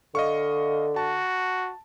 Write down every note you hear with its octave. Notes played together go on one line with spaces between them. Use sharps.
D3 D#5 F5 C#6
F#4 A5